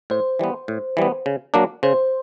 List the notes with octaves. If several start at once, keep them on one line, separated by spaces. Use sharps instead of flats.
A2 C5
E3 G3 B3
A2
E3 G3 B3
C#3
F#3 A#3 D4
C#3 C5